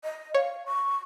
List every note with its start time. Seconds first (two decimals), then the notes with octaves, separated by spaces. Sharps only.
0.04 D#5
0.34 C#5 F5
0.66 C#6